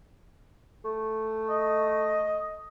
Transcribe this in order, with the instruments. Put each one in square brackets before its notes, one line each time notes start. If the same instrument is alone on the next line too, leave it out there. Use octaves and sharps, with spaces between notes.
[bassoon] A3
[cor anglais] D#5